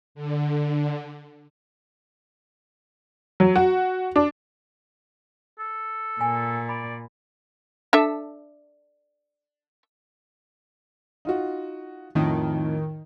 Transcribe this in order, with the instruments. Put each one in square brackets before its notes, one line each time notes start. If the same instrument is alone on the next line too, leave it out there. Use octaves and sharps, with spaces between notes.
[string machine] D3
[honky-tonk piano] F#3
F#4
D4
[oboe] A4
[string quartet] A#2 [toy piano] G#5
[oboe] D5 [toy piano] B5
[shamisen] D4 A4 E5
[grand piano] D#4 F4 F#4
[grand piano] F2 A2 [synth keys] D#3